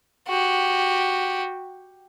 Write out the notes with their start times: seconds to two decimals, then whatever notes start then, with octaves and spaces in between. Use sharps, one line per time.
0.28 F#4 G4